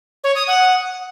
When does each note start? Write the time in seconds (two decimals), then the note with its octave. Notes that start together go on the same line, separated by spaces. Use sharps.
0.24 C#5
0.36 D#6
0.47 F#5